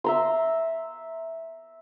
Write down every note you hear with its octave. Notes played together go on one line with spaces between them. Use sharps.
E5 A#5 C6